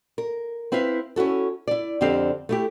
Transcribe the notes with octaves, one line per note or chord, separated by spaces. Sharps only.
A#4
C4 E4 B4 E5 F5
C#4 E4 F#4 A4
E4 D5
F2 D3 C4 G4 F5
A3 E4 G4